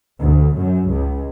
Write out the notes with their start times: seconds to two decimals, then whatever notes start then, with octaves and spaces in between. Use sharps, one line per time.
0.20 D2
0.56 F#2
0.89 C#2